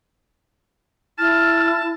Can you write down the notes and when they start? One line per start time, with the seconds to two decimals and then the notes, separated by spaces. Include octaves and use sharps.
1.18 E4 A5 F6